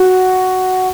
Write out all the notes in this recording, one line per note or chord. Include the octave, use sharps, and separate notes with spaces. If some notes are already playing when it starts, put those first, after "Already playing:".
Already playing: F#4